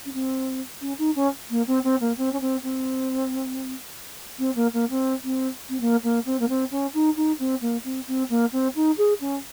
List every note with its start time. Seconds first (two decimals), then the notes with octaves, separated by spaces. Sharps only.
0.05 C#4
0.13 C4
0.81 C#4
0.98 D#4
1.15 C#4
1.50 A#3
1.67 C4
1.83 C4
2.00 A#3
2.17 C4
2.32 C#4
2.40 C4
2.63 C4
4.38 C4
4.55 A#3
4.73 A#3
4.89 C4
5.24 C4
5.69 C4
5.80 A#3
6.03 A#3
6.25 C4
6.39 A#3
6.48 C4
6.71 C#4
6.94 D#4
7.16 D#4
7.39 C4
7.61 A#3
7.84 C4
8.07 C4
8.29 A#3
8.52 C4
8.75 D#4
8.98 G#4
9.20 C#4